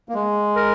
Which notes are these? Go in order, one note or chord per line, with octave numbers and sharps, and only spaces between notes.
A#3
G#3
A#4